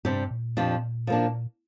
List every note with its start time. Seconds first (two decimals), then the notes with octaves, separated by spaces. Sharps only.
0.05 G2 C3 G3 D4 G4
0.31 A#2
0.57 F2 F3 D4 G4
1.07 F3 A#3 D4